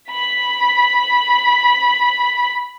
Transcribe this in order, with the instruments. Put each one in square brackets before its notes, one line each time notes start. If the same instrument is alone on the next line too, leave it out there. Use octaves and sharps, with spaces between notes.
[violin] B5 B6